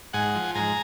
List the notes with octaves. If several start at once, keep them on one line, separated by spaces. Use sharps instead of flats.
G#2 F#5 G#5
F3
G#2 G#5 A#5